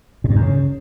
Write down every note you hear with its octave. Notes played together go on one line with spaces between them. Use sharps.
A2
G2
F#2
C#3